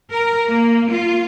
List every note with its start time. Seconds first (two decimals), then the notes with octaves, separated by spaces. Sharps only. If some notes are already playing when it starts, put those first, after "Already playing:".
0.10 A#4
0.47 A#3
0.91 F4